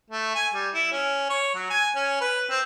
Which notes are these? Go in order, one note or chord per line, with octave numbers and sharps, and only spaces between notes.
A3
G#5
G3
E4
C#4
C#5
F#3
G#5
C#4
B4
C4